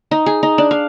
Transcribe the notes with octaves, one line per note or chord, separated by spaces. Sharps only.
D#4
G#4
D#4
D4
F5